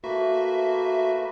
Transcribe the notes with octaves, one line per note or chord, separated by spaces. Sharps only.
A3 A#3 F#4 B4 E5